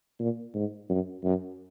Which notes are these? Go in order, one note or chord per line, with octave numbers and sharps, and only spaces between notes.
A#2
G#2
F#2
F#2